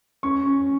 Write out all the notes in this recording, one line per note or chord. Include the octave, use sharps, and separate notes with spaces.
C#4 C#6
C#4